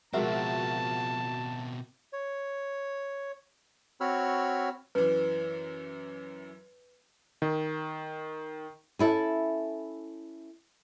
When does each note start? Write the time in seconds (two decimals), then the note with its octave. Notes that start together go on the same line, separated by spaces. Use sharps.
0.13 B2 F3 G#3 C4 F#4 A#4 E5 A5
2.13 C#5
4.01 C4 F#4 C#5 B5 E6 F6
4.95 F#2 E3 B4
7.42 D#3
8.99 C#4 E4 A4